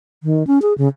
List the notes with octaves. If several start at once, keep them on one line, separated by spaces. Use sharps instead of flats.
D#3
C#4
G#4
C#3